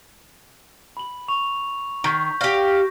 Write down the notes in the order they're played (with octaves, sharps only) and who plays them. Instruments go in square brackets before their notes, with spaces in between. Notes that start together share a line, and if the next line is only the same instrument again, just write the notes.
[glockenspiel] B5 F#7
C#6 F7
[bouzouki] D#3 [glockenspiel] C#6 G6 B6
[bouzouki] G4 F5 [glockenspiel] A#6